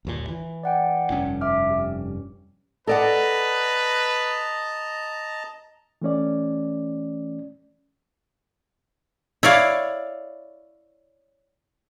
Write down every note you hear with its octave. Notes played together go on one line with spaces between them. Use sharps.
G1 D#2 A#2
E3
D5 F#5 G5
F1 G2 C#4
E5 D6 F6
G4
A4 B4 D5 D#5 F#5 A5 A#5
E3 A3 C#4 D5
E4 C#5 D5 F5